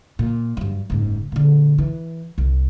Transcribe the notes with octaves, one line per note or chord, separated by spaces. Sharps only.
A#2
G2 F#3
F#1 G#2
A#2 D3
E3
C2